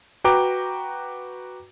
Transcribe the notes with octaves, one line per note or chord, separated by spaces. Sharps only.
F#4 B4 G5 A#5 D6